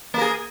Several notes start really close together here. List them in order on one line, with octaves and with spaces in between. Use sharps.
A#3 A#4 G#4